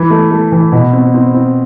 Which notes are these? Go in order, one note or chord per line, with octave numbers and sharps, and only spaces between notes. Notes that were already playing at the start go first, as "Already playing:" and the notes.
Already playing: E3 B5
A3
A3
E3
B2
C4
C4
C4